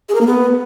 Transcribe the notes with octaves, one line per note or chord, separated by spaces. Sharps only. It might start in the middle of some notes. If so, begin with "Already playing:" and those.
G#4
A#4
A#3
B3